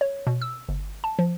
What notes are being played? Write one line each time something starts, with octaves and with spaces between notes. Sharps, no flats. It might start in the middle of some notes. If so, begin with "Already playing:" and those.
C#5
B2
E6
G1
A5
F3